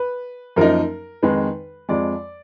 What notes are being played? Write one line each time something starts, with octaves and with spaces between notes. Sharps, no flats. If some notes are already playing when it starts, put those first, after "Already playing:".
Already playing: B4
F#2 F3 A#3 D#4 A#4
F2 D#3 G#3 D#4 B4
F2 F3 G#3 D5